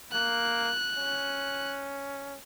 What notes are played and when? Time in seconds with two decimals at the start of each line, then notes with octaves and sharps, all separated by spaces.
0.12 A#3 F#6
0.96 C#4